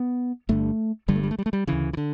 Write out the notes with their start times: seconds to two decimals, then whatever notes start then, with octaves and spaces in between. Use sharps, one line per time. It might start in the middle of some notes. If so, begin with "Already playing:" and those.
Already playing: B3
0.49 G1 G2 D3 A3
1.08 G1 G2 D3 G3
1.16 A3
1.23 G3
1.31 A3
1.39 G3
1.46 A3
1.53 G3
1.67 D2 C#3 E3
1.93 E3
1.97 D3